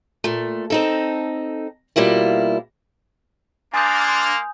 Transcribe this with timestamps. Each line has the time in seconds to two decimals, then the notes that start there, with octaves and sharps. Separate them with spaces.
0.24 A#2 A3
0.70 C4 D#4 A4
1.96 B2 G3 A#3 E4 F4
3.74 A#3 D4 G#5 C6 D#6 G6 A6
4.08 C6 F7